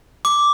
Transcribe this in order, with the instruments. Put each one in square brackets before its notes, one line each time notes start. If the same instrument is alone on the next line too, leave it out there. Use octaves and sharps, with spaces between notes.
[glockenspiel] D6